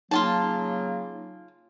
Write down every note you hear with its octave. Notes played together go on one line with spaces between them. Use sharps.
C#3 F#3 A#3 D#4 F4 F#4 A5 G7